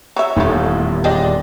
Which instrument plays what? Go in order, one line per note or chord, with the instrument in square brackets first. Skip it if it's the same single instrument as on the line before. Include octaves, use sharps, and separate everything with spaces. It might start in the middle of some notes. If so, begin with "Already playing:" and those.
[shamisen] F#3 E5
[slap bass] D#1 E2 [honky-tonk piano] A2 [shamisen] A3 C#4
[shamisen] G#3 D4 G4 [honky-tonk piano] G#4 D5 D#5